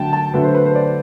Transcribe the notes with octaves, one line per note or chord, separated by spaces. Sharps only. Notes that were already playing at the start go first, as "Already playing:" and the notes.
Already playing: D3 F#3 A3 G5 A5
A5
D3 F#3 A3 B4
C5
B4
C5
D5